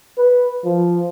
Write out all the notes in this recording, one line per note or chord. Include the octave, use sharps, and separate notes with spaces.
B4
F3